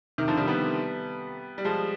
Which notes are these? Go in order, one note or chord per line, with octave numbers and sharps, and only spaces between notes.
C3 D#3
D3 F3
D#3 G3
G3 B3
G3
F3 G#3